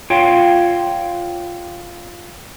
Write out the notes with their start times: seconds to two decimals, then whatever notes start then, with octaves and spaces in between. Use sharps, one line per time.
0.10 F4 C#5 F5 G5